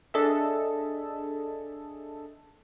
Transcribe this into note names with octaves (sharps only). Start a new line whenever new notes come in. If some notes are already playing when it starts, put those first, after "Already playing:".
D4 G#4 A4 D#5 E5